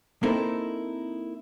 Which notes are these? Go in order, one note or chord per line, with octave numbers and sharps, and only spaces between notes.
A#3 C4 D#4 E4 A4 A#4